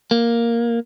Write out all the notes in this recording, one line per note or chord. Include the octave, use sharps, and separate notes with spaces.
A#3